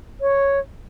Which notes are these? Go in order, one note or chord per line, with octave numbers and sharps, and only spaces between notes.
C#5